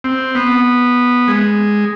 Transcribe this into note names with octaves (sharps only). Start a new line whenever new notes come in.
C4
B3
G#3